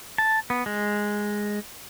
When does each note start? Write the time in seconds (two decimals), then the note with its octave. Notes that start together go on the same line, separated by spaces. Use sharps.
0.18 A5
0.50 B3
0.66 G#3